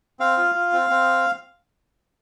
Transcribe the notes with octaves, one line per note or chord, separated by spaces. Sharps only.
C4 F5
F4
F4
C4
C4